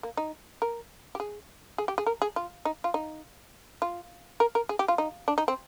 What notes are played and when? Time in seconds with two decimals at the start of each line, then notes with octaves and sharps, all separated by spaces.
0.03 A#3
0.17 D#4
0.62 A#4
1.15 G4
1.20 G#4
1.78 G#4
1.88 G4
1.98 G#4
2.06 A#4
2.22 G#4
2.36 F4
2.65 D#4
2.84 F4
2.94 D#4
3.82 F4
4.40 A#4
4.55 A#4
4.69 G#4
4.79 G4
4.88 F4
4.98 D#4
5.28 D4
5.38 D#4
5.48 C4